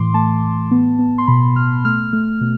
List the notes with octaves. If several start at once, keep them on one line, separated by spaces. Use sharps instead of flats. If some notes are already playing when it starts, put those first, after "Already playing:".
Already playing: A2 E3 C6 D6
A3 A5
A2
B3
B3
C6
B2 B5
B2 F6
A3 F6
A3
B2